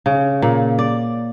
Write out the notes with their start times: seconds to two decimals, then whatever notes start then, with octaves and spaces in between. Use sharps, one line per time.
0.06 C#3
0.42 A#2
0.79 D5